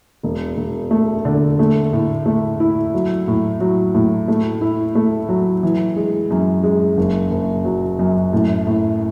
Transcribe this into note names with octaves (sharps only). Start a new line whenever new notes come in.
E1
E1
A3
D3
A3
A2
A3
E4
F#3
A2
F#3
A2
A3
E4
A3
F#3
E3
G#3
F#2
G#3
F#1
F#1
F#3
F#2
A2
A2